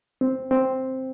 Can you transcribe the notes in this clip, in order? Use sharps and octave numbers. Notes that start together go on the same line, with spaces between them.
C4
C4